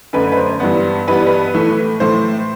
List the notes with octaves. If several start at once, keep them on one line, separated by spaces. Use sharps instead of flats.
F#2 D3 A3 B4
B4
C5
G2 E3 G3 B3
G2 E3 G3 B3 B4
B4
A2 E3 A3
A2 E3 A3 C5